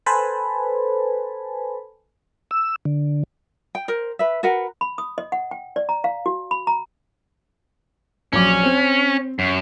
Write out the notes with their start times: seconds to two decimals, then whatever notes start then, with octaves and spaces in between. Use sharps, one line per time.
0.06 A4 B4 C5 G#5 A5 B5
2.51 E6
2.85 D3
3.75 G5
3.88 A#4 C5
4.19 B4 E5
4.43 F#4 A#4 B4 F#5
4.81 B5
4.98 D#6
5.18 D#5
5.32 F#5
5.51 G5
5.76 D5
5.89 A#5
6.04 F5
6.26 F#4
6.51 B5
6.67 A#5
8.33 A#1 F#3 C#4 D6
8.63 C4
9.39 F#2